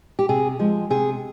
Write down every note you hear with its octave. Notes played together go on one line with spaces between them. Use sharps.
G4
C3 G#4
F3 G#3
C3 G#4